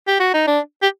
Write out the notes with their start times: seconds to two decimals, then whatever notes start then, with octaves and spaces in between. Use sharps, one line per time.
0.07 G4
0.20 F#4
0.34 D#4
0.47 D4
0.83 G4